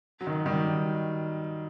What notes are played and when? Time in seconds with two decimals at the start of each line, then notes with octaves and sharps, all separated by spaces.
0.21 F#3
0.27 D#3
0.46 D#3 G3